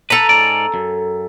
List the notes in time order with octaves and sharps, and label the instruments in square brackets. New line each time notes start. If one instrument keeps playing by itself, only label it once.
[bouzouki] A4 A#5 [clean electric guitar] B4
[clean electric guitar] G#2 C#4 D5
F#2